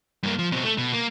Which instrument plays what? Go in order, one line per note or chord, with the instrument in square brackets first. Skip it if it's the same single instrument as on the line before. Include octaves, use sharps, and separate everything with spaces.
[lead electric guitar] G2 A#3
F3
B2 C4
A3
B2
A#3